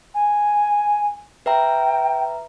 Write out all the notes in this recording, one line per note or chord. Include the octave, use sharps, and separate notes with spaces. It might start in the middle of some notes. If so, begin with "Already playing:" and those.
G#5
B4 E5 G5 A#5